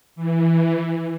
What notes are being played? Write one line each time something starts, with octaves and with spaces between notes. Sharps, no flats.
E3